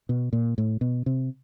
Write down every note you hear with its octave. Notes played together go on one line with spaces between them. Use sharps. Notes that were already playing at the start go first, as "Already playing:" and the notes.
B2
A#2
A2
B2
C3